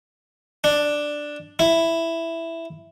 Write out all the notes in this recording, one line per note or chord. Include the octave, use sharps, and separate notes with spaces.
D4
E4